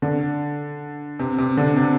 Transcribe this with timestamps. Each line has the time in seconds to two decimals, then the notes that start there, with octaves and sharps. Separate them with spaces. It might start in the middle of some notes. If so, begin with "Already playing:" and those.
0.02 D3
1.19 C3
1.38 C3
1.57 D3
1.76 C3